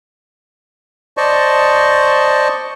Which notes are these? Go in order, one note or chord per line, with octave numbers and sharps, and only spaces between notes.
C5 D5 D#5 A5 C#6